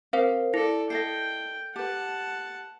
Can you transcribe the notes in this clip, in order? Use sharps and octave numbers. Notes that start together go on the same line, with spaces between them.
C4 A#4 C5 F5
E4 A4 D5
E4 A4 D#5 G5 C7
G4 B4 F#5 A5